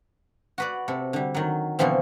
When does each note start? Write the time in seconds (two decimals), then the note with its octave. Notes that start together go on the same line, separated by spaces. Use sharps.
0.58 F#4 B4 D5
0.88 C3 A4
1.13 D3 G3
1.34 D#3 F#3
1.79 B2 D3 E3 F3 C4